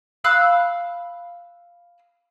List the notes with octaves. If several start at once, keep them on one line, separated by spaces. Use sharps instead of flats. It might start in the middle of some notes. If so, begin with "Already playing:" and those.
F5 B5 E6 F#6